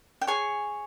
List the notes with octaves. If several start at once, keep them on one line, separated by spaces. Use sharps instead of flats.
G5
G#4 C#5 G#5